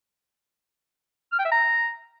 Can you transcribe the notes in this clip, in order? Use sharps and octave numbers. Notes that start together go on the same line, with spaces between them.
F6
G5
E5
A#5